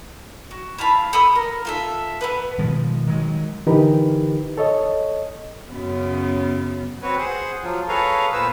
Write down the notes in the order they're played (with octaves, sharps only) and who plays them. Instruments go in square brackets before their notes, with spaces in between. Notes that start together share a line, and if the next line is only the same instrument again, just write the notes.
[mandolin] F#4
E4 F5 A5 B5
A4 B5 D#6 E6
A#4
F4 A4 E5
B3 A4 B4
[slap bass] B2 D#3 F3 G#3
D#3 F#3 G#3
[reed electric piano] D3 E3 D#4 G4 A#4 B4
A4 C#5 D#5
[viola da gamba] F#2 C#3 B3
[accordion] C4 F#4 B4 C#5
G#4 C5 F#5
F3 F#3 F4
G#4 A4 B4 C#5 F5 A#5
A#2 B3 B4 C5 E6